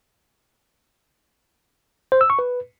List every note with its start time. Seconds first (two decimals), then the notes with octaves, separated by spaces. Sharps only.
2.12 C5
2.21 E6
2.30 C#6
2.39 B4